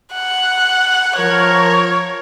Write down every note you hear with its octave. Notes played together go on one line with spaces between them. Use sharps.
F#5
F3 A#4 C#5